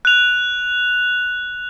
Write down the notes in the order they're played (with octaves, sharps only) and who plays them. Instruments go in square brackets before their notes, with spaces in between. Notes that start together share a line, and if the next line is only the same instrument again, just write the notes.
[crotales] F#6 F7